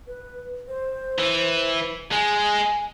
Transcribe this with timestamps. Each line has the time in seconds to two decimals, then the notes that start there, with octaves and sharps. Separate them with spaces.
0.07 B4
0.68 C5
1.19 E3
2.11 G#3 G#5